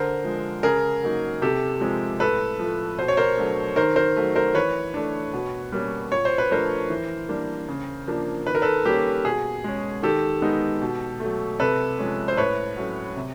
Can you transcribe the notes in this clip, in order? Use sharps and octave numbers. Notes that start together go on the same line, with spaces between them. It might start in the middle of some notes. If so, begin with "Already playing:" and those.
Already playing: D3 A#4 C5
F3 G#3
C#3 G#4 A#4
F#3 A#3 D#4
C3 G4 A4
F3 G#3 C4
A2 A4 B4
F3 A3
B2 C5
C#5
A#4 C5
F#3 A3 D4
D#3 A#4 C5
A#4 C5
F#3 A3
A#4 C5
E3 B4 C#5
A3 D4
B2
G3 A#3 C#4
A#2 C#5
C5
B4
F3 A3 D4 A#4 C5
E3
G3 A#3 D4
C#3
F3 A#3 D4
D#3 B4
A#4
A4 B4
G3 A#3 C#4 G4
B2 G#4
G#3 C#4
D#3 G4 A4
G#3 B3 D#4
B2
F#3 A3
C3 A4 B4
F3 G#3 C#4
C5
A2 B4 C#5
F#3 A3 C#4
C3